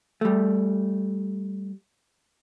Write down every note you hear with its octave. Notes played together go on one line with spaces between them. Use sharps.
G3 A3